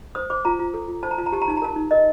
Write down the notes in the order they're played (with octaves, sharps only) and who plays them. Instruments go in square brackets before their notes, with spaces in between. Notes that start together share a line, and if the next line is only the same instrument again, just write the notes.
[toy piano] C5 D#6
C5 D6
F4 A#5
F4
A4
F4
C5 A5
A#5
F4 A5
A#5
G4 A5
A#5
D#4 A5
A#5
A#4 A5
D#4
A#4 D#5